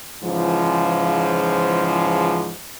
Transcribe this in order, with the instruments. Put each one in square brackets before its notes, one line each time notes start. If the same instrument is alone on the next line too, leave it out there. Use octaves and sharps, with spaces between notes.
[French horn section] G#2 C#3 E3 F3